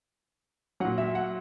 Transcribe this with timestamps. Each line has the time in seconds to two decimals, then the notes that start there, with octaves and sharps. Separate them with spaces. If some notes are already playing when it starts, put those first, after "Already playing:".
0.80 A#2 F#3 F#5
0.98 E5
1.15 F#5